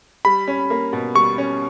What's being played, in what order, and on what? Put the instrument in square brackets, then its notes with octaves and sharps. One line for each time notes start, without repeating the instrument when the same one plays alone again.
[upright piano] G3 [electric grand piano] B5
[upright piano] C#4
A#3
B2
[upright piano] G3 [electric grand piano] C#6
[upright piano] C#4